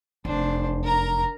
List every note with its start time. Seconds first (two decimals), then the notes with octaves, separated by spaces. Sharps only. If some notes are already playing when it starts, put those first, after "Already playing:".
0.25 F1 E2 D4 C5
0.83 A#4 A#5